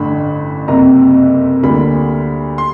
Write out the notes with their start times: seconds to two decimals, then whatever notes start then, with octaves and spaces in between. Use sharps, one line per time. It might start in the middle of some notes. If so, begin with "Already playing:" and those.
Already playing: A1 G2 D3 B5
0.68 F#1 F2 C3 A#5
1.63 D2 D3 G3 A#3 B5
2.58 C6